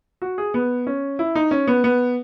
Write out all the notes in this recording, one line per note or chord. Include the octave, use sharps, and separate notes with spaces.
F#4
G#4
B3
C#4
E4
D#4
C#4
B3
B3